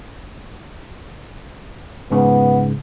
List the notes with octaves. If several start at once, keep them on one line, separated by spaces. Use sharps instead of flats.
G#2 C#3 B3